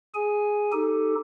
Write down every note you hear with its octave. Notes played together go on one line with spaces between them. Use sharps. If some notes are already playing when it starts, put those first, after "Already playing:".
G#4 G#5
D#4 G4 A4